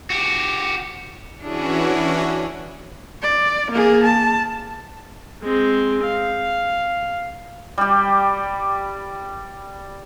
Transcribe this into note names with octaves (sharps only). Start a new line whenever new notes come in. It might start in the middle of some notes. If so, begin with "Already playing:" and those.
F#4 G4
E3 C#4 D4 E4 F#4 G#4
D5
A#3 G#4
A5
G#3 C4
F5
G3 G4